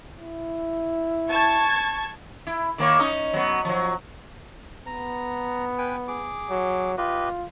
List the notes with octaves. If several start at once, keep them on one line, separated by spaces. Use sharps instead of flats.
E4
A5 C#6 G#6
E4
D#3 A#3 C#5
C#4 D#4 D#5
F#3 B3
F3 F#3
B3 A#5
B4 G5 G#5
G#4 D6
F#3
F4 G4 B4 D#5